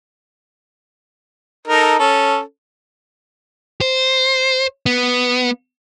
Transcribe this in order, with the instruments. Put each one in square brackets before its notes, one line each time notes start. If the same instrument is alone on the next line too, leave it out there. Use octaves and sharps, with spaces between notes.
[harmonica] D#4 A4 A#4
C#4 A4
[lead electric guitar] C5
B3